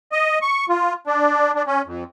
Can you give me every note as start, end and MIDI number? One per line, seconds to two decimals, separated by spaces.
0.12 0.39 75
0.42 0.66 85
0.69 0.93 65
1.07 1.51 62
1.55 1.62 62
1.67 1.82 61
1.87 2.04 41